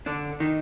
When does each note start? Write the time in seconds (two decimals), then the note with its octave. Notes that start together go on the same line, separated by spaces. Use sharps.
0.06 D3 D4
0.40 D#3 D#4